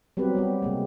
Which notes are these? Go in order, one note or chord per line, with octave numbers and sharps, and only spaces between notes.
F#3 G3 B3 C4 G4 B4
G3 B3 G4
C3 G#3 A#3